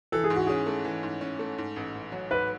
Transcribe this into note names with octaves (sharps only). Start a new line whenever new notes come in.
E3 A4
G#4
G#2
F#4
C#4 G#4
A3
E3
G#2
C#4
A3
G#2
A1
A1
F#3
G#2 B4